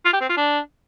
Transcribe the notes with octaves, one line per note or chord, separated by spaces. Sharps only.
F4
G4
C4
F4
D4